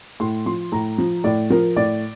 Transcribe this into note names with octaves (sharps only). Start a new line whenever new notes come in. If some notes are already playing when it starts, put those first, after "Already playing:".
A2 C6
F3 C6
A2 A#5
F3
A2 D5
F3 A#4
A2 D5